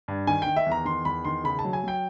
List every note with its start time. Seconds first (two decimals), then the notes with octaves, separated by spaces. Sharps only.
0.08 G2
0.27 D#3 G#5
0.42 D#3 G5
0.56 E5
0.66 E2
0.72 A#5
0.85 D#3 C6
1.05 E2 B5
1.25 D#3 C6
1.44 C#3 B5
1.59 A5
1.65 F#3
1.73 G#5
1.84 F#3 G5